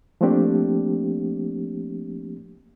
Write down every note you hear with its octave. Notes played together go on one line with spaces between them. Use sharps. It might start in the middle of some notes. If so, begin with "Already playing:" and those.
F3 A3 A#3 C4 D4 G4